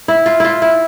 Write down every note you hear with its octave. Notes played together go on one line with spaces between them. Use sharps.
E4
F4
E4 F4
E4